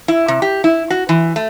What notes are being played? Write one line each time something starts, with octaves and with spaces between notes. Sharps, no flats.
E4
C3
G4
E4
F#4
E3
A3